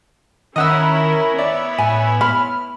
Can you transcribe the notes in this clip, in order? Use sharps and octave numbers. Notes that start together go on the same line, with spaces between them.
D#3 C#4 E4 A#4 D#5 F#5 E6
B3 E4 C#5 D5 E5
A2 G#5
B5 F6